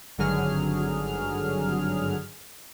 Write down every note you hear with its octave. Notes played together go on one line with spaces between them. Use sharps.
G#1 G2 D3 F#3 G#4 F6